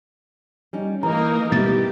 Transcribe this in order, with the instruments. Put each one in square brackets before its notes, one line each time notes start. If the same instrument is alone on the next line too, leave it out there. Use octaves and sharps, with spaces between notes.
[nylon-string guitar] G3 C#4 D#4
[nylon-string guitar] E3 [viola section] A#3 D#4 A#4 [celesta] A#5
[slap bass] B2 G3 A#3 [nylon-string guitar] E4 [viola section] G4 [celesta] A6